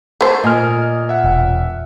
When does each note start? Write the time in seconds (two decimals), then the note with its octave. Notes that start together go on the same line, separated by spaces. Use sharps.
0.21 A3 A4 C5
0.44 A#2 D#5 G#5 F6
1.09 E5 F#5
1.24 E1